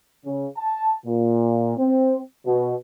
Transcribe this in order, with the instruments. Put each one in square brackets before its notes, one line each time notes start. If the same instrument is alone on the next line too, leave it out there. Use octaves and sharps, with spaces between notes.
[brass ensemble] C#3
A5
A#2
C4
B2